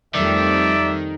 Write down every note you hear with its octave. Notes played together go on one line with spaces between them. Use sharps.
F2 D#3 G3 A3 D5 E5